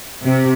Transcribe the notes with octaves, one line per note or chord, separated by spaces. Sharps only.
C3